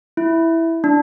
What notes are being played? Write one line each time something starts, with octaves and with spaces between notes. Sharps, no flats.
E4
D4